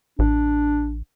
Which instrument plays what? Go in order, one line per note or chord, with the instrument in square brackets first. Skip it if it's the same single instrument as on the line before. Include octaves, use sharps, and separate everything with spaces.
[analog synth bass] A1 [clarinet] D4